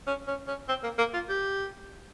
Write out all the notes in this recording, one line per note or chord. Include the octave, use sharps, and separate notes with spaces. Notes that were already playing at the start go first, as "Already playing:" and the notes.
C#4
C#4
C#4
C4
A#3
A#3
F4
G4